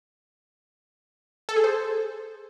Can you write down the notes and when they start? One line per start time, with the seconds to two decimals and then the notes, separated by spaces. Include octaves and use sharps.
1.49 A4
1.56 G#4
1.64 C5